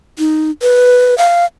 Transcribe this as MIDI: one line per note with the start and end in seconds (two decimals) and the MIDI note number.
0.18 0.51 63
0.62 1.17 71
1.18 1.45 77